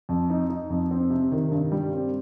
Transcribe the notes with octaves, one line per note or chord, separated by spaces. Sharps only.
F2
D#4
D#4
F2
C4
C3
D#3
G2
G3
C4